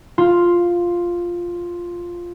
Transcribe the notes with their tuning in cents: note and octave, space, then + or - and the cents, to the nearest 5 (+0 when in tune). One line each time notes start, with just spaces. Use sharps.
F4 +0